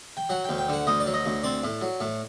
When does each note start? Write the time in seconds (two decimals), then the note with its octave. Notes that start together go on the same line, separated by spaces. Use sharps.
0.17 G5
0.30 F#3 F#5
0.44 D2 G5
0.58 G5
0.68 D3 F#5
0.87 D2 D#5
1.00 D5
1.06 F#3
1.14 D#5
1.26 D2
1.43 C4 D5
1.64 A2
1.81 F#3
2.01 A2